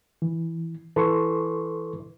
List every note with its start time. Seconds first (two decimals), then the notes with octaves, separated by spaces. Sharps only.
0.22 E3
0.96 E3 A4 C6 C#6